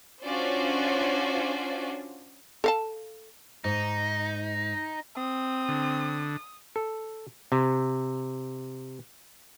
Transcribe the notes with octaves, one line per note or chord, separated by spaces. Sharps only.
C#4 D4 F4 F#4 C5 D5
A4 F5 A5
G#2 D#4
C4 D#6
D3
A4
C3